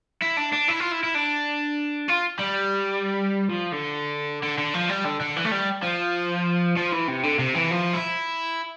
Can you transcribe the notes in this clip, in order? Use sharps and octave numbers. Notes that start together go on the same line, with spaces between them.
E4
D4
D4
E4
F4
E4
E4
D4
F4
G3
F3
D3
D3
D3
F3
G3
D3
D3
E3
A3
G3
F3
F3
E3
C3
D3
C3
E3
F3
E4